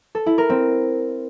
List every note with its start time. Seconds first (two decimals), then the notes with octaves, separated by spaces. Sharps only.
0.15 A4
0.26 E4
0.38 A#4
0.50 C4